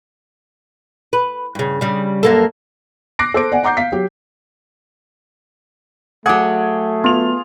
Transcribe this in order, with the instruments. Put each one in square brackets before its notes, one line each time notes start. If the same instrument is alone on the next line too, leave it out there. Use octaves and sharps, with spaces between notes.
[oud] B4
G2 C#3
C#3 G3
F#2 A#3 A4
[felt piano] D6 F#6 A#6 C7 D7
A4 C5 D6 D7
D5 F#5 G#5
F#5 A#5 D6 G6 C7
F5 B6
F#3 G4
[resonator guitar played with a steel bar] F#3 F#5 [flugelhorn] A3 [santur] G#4 [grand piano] D6 G#6
[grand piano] B3 F7 [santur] F4